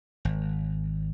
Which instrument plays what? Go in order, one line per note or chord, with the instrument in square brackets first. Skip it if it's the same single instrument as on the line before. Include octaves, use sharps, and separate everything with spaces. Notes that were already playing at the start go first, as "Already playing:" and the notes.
[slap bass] G#1